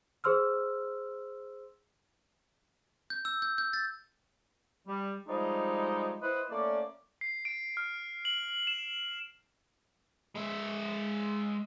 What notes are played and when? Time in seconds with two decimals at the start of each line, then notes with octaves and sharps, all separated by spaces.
0.24 G#4 C5 C6 E6 F6
3.10 G6
3.25 E6
3.42 G6
3.58 G6
3.73 A6
4.87 G3
5.28 F3 G3 G#3 D#4
6.22 E4 B4 C5 D#5 F#5
6.50 A3 A#3 C#4 D5
7.21 C7
7.45 D7
7.77 F6
8.25 F#7
8.67 E7
10.36 G#3 E5